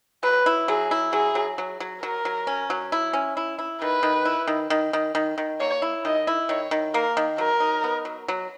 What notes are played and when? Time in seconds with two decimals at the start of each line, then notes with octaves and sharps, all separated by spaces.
0.23 F#3 B4
0.46 E4
0.68 F#3 G#4
0.91 E4
1.13 F#3 G#4
1.35 F#3
1.58 F#3
1.80 F#3
2.02 F#3 A#4
2.25 F#3
2.47 C#4
2.70 F#3
2.92 E4
3.13 C#4
3.37 E4
3.59 E4
3.81 D#3 B4
4.03 D#3
4.25 E4
4.47 D#3
4.70 D#3
4.93 D#3
5.15 D#3
5.38 D#3
5.60 A#3 C#5
5.82 E4
6.05 D#3 D#5
6.27 E4
6.49 D#3 C#5
6.71 D#3
6.94 A#3 A#4
7.17 D#3
7.38 F#3 A#4
7.60 D#4
7.84 B3
8.05 F#3
8.28 F#3